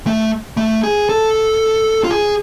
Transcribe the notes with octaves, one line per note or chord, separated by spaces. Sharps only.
A3
A3
G#4
A4
F4
G#4